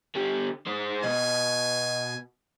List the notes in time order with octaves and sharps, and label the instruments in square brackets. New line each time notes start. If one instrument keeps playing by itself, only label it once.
[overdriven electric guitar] D3 G4
G#3 C5
[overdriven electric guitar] B2 [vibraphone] D#5 [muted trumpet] G#5